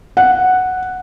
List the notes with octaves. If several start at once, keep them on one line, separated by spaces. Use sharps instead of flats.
F#5